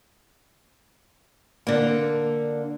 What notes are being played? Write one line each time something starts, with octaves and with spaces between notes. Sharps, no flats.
D3 A#3